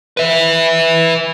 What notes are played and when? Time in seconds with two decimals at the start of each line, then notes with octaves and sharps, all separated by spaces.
0.17 B4 E5